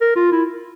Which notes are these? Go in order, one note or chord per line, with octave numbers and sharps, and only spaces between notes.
A#4
F4
E4